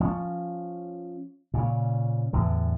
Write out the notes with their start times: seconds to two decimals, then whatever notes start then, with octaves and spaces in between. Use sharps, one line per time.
0.01 F3 C#4
1.54 A#2 C#3
2.33 E2 A2 D3